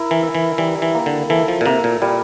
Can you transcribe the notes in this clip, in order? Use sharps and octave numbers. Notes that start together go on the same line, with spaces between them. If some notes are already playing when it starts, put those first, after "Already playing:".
Already playing: E4 A#4
E3
E5
E3
E3 G3
E3
A#3
D3
E3 A4
F3
A#2
C3 A#3
A#2
A#2 G3